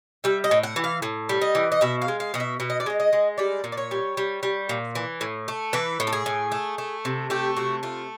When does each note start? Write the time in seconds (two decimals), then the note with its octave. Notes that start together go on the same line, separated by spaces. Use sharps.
0.24 G3 E5
0.44 D#5
0.51 A2
0.63 F#5
0.76 E3
0.84 F5
1.02 A2
1.29 G3
1.42 D#5
1.55 E3
1.72 D#5
1.81 B2 E5
2.02 F5
2.08 G#3
2.20 F5
2.34 B2 D#5
2.40 E5
2.60 B2 E5
2.70 D#5
2.80 D5
2.86 G#3 D#5
3.00 D#5
3.13 G#3
3.38 G3 D5
3.64 A#2
3.72 D5
3.77 C#5
3.91 G3
4.17 G3
4.43 G3
4.69 A#2
4.95 E3
5.21 A2
5.48 A3
5.73 E3 B4
6.00 A2
6.07 A4
6.13 G#4
6.26 A2
6.52 A3
6.78 A3
7.05 C3
7.30 A3 G4
7.57 C3 F#4
7.83 A3 F4